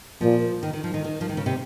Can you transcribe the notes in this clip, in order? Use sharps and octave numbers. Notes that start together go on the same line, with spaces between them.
A#2 F3
D#3
D#3
F3
D#3
D#3
F3
D#3
C#3
C3